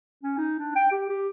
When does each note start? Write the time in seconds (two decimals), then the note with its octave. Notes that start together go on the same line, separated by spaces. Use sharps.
0.23 C#4
0.37 D#4
0.59 D4
0.75 G5
0.91 G4
1.09 G4